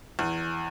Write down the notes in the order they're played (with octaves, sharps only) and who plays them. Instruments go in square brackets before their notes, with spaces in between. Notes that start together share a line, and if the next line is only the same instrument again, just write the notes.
[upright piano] E2